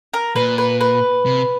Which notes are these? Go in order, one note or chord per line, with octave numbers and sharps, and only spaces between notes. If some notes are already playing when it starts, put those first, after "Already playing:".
A#4
A#2 B4
B4
B4
C3